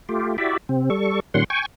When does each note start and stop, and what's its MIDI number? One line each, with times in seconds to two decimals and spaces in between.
0.09 0.37 57
0.09 0.37 65
0.09 0.37 67
0.38 0.57 64
0.38 0.57 66
0.38 0.57 67
0.38 0.57 74
0.38 0.57 76
0.69 0.90 48
0.69 0.90 60
0.90 1.20 55
0.90 1.20 69
0.90 1.20 85
1.34 1.44 46
1.34 1.44 51
1.34 1.44 55
1.34 1.44 61
1.34 1.44 78
1.34 1.44 84
1.50 1.66 79
1.50 1.66 80
1.50 1.66 85